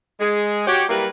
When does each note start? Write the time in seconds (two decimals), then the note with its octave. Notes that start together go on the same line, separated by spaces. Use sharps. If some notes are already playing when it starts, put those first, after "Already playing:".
0.20 G#3 G#4
0.68 F#4 G4 C#5
0.89 F#3 G3 A#3 E4 A#4 B4